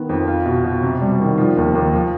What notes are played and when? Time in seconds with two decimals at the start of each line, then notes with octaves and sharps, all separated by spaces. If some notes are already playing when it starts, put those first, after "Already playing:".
Already playing: D#3 B3
0.09 F2
0.28 F4
0.46 B2
0.64 B2
0.82 C3
1.01 G3
1.20 D#3
1.38 F3
1.57 D#2
1.75 D#2
1.93 F3